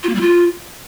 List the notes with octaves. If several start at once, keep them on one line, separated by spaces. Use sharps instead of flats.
F4
A#3
G3
F4